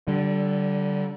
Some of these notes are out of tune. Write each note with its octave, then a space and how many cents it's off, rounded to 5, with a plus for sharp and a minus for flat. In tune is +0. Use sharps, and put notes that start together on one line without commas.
D3 +0 G3 -30